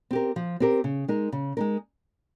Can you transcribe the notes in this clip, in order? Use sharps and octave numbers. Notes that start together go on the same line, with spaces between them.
C4 G4 A#4
F3
C4 G4 A#4
C#3
G#3 D#4 A#4
C#3
G#3 D#4 A#4